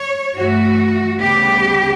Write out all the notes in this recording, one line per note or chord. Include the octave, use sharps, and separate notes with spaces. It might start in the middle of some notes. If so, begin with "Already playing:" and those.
Already playing: C#5
G2 E3 A3 F#4
D2 C#3 G3 B3 G4